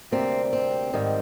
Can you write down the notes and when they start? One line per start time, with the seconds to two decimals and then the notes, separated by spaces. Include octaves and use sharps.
0.11 D2 C3 G3 A#3 C4
0.53 C4
0.93 G#2 D#3 G3